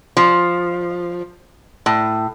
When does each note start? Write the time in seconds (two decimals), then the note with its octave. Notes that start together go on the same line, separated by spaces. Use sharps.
0.17 F3
1.86 A2